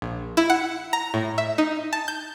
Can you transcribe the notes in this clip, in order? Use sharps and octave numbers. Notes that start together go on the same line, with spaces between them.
A#1
E4
F#5
A#5
A2
E5
D#4
A5
G6